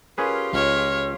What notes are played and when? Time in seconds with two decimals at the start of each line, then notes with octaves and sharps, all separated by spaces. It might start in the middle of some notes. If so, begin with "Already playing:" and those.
0.18 C#4 F4 G4 G#4 A#4 B4
0.54 C#2 C#5 F6